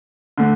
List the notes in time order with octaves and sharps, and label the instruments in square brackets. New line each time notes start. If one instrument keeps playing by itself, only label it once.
[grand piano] D3 A3